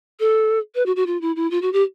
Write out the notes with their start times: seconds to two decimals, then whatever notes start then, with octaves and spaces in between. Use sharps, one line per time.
0.20 A4
0.75 B4
0.86 F#4
0.96 F#4
1.07 F4
1.21 E4
1.36 E4
1.51 F4
1.62 F#4
1.73 G4